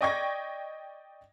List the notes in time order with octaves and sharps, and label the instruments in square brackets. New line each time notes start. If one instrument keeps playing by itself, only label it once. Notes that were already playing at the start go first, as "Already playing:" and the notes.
[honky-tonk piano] D5 D#5 G5 C#6 G#6 A#6